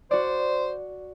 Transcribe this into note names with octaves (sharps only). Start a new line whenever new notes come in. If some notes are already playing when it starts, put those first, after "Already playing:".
F#4 C5 D5